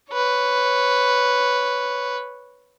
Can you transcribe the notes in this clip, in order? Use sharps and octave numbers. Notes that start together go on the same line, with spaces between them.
B4 C#5